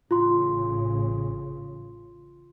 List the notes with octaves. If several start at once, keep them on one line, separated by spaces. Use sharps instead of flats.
A1 C#3 F4 C6